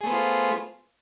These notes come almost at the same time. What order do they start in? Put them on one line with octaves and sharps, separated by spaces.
G#4 A3 B3 C5 F4